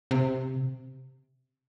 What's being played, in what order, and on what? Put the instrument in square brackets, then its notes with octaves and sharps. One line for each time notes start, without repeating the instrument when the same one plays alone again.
[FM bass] C3